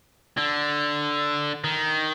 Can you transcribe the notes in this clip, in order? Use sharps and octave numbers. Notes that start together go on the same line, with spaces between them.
D3
D#3